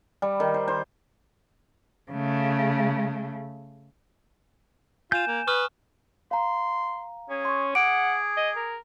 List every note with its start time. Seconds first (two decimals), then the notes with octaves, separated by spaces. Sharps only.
0.22 G3
0.40 D#3
0.54 C5
0.68 C5
2.11 C#3 A3
5.12 F4 G#5 G6 E7
5.27 A#3
5.47 B4 C#6 D#6 F6
6.31 F5 A#5 C6
7.30 C#4 G#4
7.45 C6 C#6
7.75 G#4 F#5 D6 D7
8.37 D#5
8.56 A#4